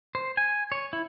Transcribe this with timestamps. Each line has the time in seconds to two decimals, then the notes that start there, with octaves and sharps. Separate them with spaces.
0.15 C5
0.37 G#5
0.72 C#5
0.93 E4